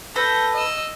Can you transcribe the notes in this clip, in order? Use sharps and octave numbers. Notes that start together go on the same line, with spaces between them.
A4 B4 G6 A#6
D#5 E6